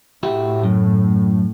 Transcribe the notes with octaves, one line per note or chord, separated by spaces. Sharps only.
A2 E4 F#4 G4
F#2